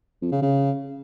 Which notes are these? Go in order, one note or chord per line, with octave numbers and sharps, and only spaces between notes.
F2
C#3
C#3